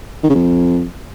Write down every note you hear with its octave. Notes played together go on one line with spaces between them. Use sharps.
D#3
C#3
F2